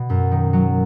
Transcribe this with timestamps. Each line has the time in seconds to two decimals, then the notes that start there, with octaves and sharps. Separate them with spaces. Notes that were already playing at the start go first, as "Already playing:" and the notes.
Already playing: B2
0.10 F#2
0.32 D#3
0.53 F#3